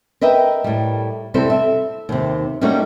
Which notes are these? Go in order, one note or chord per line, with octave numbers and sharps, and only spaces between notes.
A#4 B4 D#5 E5 G5
A2 G3
C3 G3 C4 E4 A4
E5
D#2 C3
G3 A3 A#3 C#4 D#4 F#4